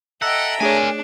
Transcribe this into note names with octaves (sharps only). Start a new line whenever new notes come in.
A4 D#5 E5 F#5 G5 A#5
A3 D4 G#4 A#4 C#5 G#5